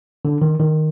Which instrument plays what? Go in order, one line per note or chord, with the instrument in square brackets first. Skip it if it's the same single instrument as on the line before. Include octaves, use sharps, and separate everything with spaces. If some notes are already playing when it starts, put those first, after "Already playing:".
[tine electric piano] D3
D#3
D#3